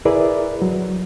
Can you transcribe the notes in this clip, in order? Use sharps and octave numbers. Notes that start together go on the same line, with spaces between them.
E4 G#4 A#4 B4 D5 E5
F#3